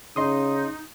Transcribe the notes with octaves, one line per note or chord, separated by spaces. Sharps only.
C#3 D#4 D#5 C6 D#6